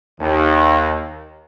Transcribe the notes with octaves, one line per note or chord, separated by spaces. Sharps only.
D#2